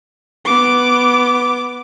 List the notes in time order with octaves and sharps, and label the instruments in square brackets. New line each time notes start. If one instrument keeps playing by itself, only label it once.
[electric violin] B3 D6